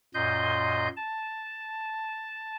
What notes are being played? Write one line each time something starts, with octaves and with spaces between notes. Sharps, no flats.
F#2 A#2 D#5 C6 G6
A5